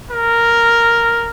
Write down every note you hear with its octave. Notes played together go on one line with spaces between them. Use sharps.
A#4